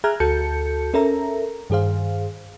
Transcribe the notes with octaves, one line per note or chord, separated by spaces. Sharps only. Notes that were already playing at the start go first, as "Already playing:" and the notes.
G#4 E5 A#5 F6 F#6 G#6
D2 F#4 A4 A5 G6 C#7
C#4 A4 A#4 E5 A#5
G2 D#3 G#4 C5 F5